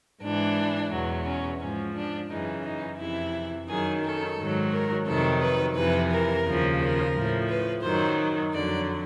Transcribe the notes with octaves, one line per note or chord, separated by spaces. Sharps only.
G#2 E3 D4
E2 B2 F#3
C#4
G#2 F3 C#4
D4
F#2 C#3 E3 D#4
D#4
F2 C3 E3 E4
F#2 D#3 F#3 G#4
A4
G#2 D#3 F#3
A#4
F2 C3 D#3 F#3 A4
B4
F2 C3 E3 B4
A#4
D#2 C#3 F3
A#4
A2 F3
B4
F#2 D#3 F#3 C5
F2 D3 F#3 D5